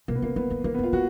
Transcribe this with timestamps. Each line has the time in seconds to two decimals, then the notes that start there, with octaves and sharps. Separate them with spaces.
0.08 B2 A#3
0.15 B3
0.22 C#3 A#3
0.36 D3 B3
0.50 D#3
0.64 D#3 A#3
0.74 B3
0.79 D3 F4
0.92 C#3 F#4